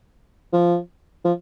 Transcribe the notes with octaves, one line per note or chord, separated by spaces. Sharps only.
F3
F3